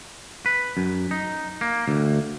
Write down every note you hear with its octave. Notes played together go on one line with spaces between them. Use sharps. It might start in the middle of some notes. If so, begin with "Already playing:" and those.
B4
F#2
D#4
A#3
D2